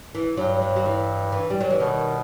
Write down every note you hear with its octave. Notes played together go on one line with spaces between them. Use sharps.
E3
G2 F#3
F#3
F#3
E3
E3
G3
F#3
E3
B2 D#3